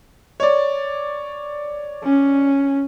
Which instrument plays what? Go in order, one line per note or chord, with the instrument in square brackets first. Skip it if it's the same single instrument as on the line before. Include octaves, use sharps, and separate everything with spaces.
[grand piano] C#5 D5
[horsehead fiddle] C#4